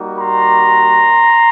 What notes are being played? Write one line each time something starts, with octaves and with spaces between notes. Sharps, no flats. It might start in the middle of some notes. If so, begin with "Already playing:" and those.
Already playing: G3 A#3 D#4 F#4
A#5 C6